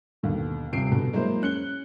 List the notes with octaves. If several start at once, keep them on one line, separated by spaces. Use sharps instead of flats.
D#2 B2 D3
D#1 C3 C7 D7
B2 D3
F#3 G#3 A#3 E4 C5
C#4 F#6 C#7 G7